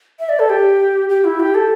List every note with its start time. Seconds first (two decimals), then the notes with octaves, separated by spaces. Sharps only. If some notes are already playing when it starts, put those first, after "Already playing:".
0.19 E5
0.29 D5
0.39 A4
0.49 G4
1.09 G4
1.24 E4
1.40 G4
1.54 A4